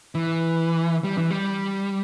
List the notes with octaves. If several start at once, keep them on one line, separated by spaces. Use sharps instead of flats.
E3
G3
E3
G3